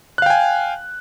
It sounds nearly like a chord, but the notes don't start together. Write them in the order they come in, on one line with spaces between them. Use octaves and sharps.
F#6 F5 G5 G#5